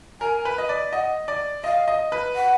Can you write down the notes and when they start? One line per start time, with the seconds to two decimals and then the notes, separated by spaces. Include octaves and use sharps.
0.21 A#4 G#5
0.45 B4
0.58 D#5
0.69 D5
0.93 D#5 F#5
1.28 D5
1.64 D#5 F5
1.88 D#5
2.12 B4
2.35 F#5